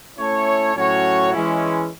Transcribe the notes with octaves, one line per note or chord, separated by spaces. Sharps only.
A3 C#4 E4 A4 C#5
A2 F#3 C#4 F#4 C#5
E3 G#3 C#4 E4